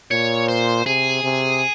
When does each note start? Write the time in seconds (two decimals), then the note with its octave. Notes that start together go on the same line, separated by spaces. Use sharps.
0.11 A#2 C#5
0.48 C5
0.86 C3 G#4
1.24 C3